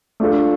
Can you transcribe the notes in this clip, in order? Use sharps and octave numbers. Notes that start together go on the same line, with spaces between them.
A3 D4 F4 A4